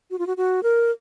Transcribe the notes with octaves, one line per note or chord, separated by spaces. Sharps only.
F#4
F4
F#4
F#4
A#4